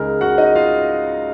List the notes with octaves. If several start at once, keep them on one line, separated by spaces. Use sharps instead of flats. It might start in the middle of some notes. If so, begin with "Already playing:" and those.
Already playing: C#2 C#3 G#3 D#4 A#4
F#4 F#5
D#4 D#5
F4 F5